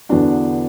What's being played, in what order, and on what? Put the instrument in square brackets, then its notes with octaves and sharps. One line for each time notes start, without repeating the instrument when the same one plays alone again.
[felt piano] E2 D3 B3 D4 F#4